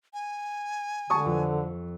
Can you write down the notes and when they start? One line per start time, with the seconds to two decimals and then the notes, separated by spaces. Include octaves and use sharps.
0.14 G#5
1.10 D3 A5 C#6 D#6
1.26 F2